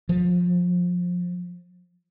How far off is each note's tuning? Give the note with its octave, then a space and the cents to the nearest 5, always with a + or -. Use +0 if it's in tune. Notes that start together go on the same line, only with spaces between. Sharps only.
F3 +25